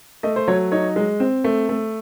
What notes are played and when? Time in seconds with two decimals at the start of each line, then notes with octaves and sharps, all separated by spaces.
0.23 A3 D#5
0.36 C5
0.48 F#3 C#5
0.72 D#4 C#5
0.96 G#3
1.20 C4
1.44 A3
1.69 A3